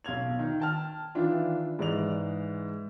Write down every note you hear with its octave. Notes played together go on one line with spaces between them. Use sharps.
B1 F5 G#6 F7
D#3
G5 A5 F6
D#3 E3 D4 E4 F4
G#2 E3 G#3 D5 D#5 F7